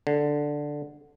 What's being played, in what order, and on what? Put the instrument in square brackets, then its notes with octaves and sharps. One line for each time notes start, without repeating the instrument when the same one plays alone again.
[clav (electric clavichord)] D3